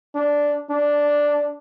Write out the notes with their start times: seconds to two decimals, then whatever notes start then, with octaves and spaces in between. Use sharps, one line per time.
0.15 D4
0.70 D4